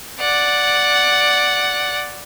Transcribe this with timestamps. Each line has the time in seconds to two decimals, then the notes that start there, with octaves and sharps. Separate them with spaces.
0.20 D5 F#5